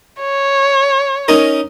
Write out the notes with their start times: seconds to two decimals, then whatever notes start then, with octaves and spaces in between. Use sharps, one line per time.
0.20 C#5
1.28 C#4 D#4 A#4